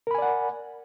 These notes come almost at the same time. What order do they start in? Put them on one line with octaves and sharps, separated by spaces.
A#4 B5 G#5 D5 F#5